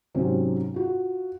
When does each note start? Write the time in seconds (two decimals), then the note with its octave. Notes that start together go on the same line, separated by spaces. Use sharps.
0.15 G#2 C3 F#3 C4 C#4
0.74 F4 F#4